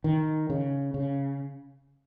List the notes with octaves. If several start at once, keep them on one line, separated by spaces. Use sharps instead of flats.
D#3
C#3
C#3